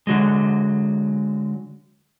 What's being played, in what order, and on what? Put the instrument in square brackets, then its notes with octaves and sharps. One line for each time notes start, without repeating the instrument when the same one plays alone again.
[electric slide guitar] D3 F#3 G#3